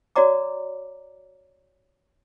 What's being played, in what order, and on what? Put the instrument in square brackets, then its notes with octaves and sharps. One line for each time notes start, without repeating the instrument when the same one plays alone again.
[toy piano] F#4 C#5 D5 A#5 D6